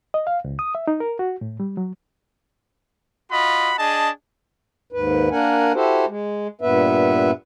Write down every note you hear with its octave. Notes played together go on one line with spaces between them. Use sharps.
D#5
F5
C#2
D#6
E5
D#4
A#4
F#4
A2
G3
F#3
F4 F#4 D#5 B5
D4 G#4 D#5 A5
D#2 G#2 B4
A#3 D4 A#4 F#5 G#5
E4 F#4 G4 A4 C5
G#3
G2 A#2 B3 B4 E5